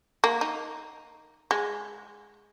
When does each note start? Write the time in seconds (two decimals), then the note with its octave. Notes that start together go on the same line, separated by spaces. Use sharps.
0.24 A#3
0.41 D#4
1.51 G#3